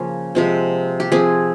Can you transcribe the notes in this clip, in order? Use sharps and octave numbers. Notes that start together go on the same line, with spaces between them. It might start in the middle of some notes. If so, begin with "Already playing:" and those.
Already playing: C#3 F3 A#3 C#4
C3 F3 G#3 C4
G4
F3 C4 G#4